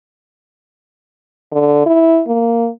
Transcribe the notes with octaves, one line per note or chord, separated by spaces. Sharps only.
D3
E4
A#3